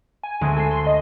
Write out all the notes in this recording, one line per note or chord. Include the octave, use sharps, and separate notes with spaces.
G#5
D2 G#3 C4
A4 C7
C6
D#5